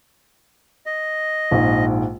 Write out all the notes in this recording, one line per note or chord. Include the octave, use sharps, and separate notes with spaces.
D#5
A#1 G#2